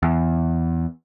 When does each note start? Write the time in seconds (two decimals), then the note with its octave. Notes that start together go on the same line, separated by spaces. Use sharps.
0.03 E2